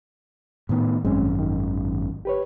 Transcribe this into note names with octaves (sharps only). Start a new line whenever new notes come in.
A2 D#3 B3
G#1 F#2 G#3 C4 C#4
D#3
G4 B4 C#5